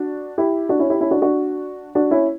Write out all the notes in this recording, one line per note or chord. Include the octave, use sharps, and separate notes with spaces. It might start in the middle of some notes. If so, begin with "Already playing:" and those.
Already playing: D4 F#4
E4 G4
D4 F#4
C#4 E4
E4 G4
C#4 E4
D4 F#4
D4 F#4
D4 F#4
C#4 E4